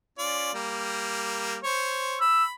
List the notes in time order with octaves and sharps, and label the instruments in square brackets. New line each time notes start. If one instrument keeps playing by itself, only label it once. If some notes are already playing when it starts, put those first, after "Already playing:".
[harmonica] C#4 F4 D5
G3 A#3
C5 C#5 C#6
[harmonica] B5 [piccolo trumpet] E6